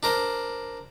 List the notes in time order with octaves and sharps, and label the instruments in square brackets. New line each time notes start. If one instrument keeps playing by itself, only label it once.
[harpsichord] D4 A#4 C5